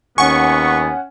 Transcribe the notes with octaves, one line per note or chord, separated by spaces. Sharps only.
D#2 B3 C#4 F#5 G#5 C#6